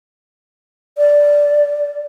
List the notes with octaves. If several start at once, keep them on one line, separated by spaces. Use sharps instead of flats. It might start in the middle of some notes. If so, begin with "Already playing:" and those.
D5